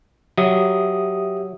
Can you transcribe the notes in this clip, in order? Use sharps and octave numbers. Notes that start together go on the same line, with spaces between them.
F#3 G4 E5 D#6